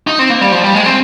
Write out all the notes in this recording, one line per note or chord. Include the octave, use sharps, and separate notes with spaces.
D#4
C4
A#3
G3
F3
G3
G#3
C4